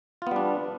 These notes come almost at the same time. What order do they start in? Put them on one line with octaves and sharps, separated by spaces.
F4 B3 G3 D4